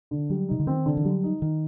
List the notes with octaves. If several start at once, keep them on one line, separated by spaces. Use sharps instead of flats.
D3
F#3 G3
C3 D#4
D3
D#3 C4
D3
D#3
F#3 G3
D#4
D#3 D#4